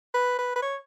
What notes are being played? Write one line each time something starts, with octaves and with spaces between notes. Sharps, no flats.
B4
B4
B4
C#5